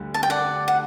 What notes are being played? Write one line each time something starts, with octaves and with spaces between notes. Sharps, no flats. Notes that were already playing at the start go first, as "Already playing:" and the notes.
Already playing: D2 D3 G3
A5
G5
D5 F#5
F#5